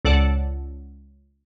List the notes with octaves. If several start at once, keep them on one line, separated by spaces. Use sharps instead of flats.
C#2 A4 D5 F#5 A5